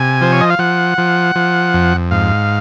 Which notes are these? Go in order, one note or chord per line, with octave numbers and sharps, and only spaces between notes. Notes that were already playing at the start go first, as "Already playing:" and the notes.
Already playing: C3 G#5
F3 C5
C#5
D#5
F5
F3 F#5
F3
F3
F2
G#2 F5